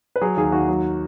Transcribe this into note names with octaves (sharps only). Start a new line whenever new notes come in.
B4
F#3 G#4
D#2 G#4
D#2 F#4
F#3